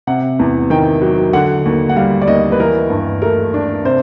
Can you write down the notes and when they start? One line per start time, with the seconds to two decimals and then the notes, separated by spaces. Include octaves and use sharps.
0.07 C3 F#5
0.39 E2
0.70 D#3 G5
1.02 F#3
1.33 D3 F#5
1.65 D#2
1.89 F#5
1.96 G3 F5
2.22 D5
2.27 D#2 D#5
2.52 B4
2.60 E3 A#4
2.90 G2
3.22 A3 A#4
3.54 D4
3.85 C3 C5